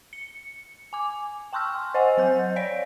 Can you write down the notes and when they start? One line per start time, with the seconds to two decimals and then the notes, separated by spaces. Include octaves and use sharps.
0.13 C#7
0.93 G#5 D6
1.53 G5 A5 C6 C#6 E6 F6
1.94 C5 D#5 F#5 G#5
2.17 F#3 C5 G6
2.56 C#5 D5 F5 D7